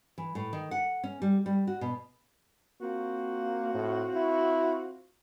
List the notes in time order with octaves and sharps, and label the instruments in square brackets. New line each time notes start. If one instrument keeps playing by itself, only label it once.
[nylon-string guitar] E3
A2
D#3
F#5
C#4
G3
G3
F#4
B2
[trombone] A#3 [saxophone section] C4 F4 F#4
[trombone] A2
E4